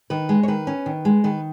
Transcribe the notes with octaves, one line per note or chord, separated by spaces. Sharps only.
D#3 B4
G#3
C#5
D#3 B4
C#4
D#3
G#3
D#3 B4